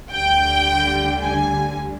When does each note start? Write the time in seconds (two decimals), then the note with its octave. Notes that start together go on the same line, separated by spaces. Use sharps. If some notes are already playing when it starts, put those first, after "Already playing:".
0.12 D2 D3 G3 G5
1.21 G#5